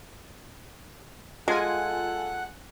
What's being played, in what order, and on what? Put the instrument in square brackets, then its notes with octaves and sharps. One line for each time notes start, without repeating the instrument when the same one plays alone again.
[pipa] G#3 [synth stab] F4 G#5 [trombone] A4 [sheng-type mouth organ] F#5 F#6